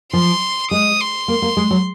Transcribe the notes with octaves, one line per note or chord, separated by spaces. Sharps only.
F3 C6
G#3 D#6
C6
A#3
A#3
G#3
F#3